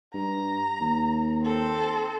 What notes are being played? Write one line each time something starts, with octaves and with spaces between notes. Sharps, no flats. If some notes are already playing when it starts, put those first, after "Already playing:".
G2 A#5
D#2
C4 A4